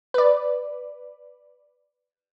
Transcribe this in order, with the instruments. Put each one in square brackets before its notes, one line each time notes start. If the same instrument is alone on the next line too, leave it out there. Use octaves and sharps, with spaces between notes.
[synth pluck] B4 D5